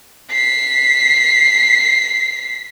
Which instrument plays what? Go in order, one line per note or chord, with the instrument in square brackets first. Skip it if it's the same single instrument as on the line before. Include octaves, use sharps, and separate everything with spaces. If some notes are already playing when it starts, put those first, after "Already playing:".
[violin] B6 C7